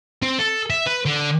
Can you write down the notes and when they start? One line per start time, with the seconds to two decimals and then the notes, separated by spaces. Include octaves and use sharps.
0.22 C4
0.39 A4
0.70 E5
0.86 B4
1.06 D3